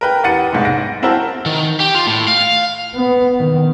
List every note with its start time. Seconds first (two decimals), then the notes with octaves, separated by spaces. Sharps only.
0.01 A#4 B4 G5
0.23 E2 G4 F#5 A6 C#7 D#7
0.53 F1 B1 G#2
0.65 A#6 D7
1.02 C4 E4 F#4 A#4 C5 A5
1.46 D#3
1.80 G4
1.95 F4
2.07 A2
2.28 F5
2.95 B3
3.39 D#3